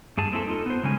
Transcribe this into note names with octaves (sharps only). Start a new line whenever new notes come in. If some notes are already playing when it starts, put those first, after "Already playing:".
G2 G#4 A5
A#3 C4 E4 F#4 A4
D#4 F4 A4
B3 C5
C#3 F#3 G#3 C#4 G#5